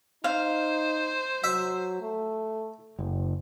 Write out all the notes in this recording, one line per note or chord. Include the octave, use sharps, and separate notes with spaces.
D#4 C5 F5
F#3 E5
A3
F#1